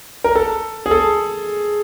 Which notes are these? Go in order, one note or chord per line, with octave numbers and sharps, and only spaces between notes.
A#4
A4
G#4
A4